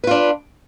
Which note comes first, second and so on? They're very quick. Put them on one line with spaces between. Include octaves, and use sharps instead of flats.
B4 F4 D4